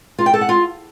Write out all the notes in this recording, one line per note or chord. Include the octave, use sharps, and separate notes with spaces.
F4
G5
A4
F#5
F4